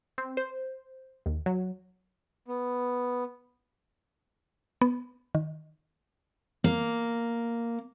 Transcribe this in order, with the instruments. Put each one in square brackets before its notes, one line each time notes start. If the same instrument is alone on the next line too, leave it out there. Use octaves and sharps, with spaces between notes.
[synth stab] C4
C5
D#2
F#3
[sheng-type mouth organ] B3
[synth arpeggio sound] B3
D#3
[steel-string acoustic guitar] A#3